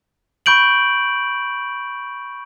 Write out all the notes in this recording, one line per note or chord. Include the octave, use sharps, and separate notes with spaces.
B5 C#6 G6 D7 F#7